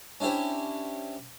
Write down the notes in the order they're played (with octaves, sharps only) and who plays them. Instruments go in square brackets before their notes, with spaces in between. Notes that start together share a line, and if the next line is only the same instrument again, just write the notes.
[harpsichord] C#4 D4 E4 G4 C5